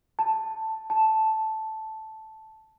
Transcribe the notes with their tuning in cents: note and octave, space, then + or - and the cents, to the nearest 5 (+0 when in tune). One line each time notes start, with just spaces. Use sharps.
A5 +5
A5 -5